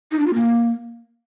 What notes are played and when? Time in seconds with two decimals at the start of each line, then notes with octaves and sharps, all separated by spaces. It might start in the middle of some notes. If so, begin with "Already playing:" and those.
0.12 D#4
0.19 D4
0.27 F4
0.34 A#3